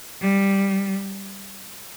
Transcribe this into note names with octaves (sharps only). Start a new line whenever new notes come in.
G3